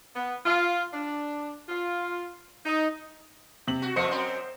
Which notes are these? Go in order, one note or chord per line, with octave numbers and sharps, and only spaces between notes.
B3
F4
D4
F4
D#4
C3 F#7
F#4
F3 A3 C5 D#5 C#7
F#2 C4